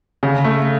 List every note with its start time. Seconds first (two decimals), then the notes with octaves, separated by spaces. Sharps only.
0.23 C#3
0.44 A3